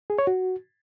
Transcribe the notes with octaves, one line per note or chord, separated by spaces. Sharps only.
G#4
C#5
F#4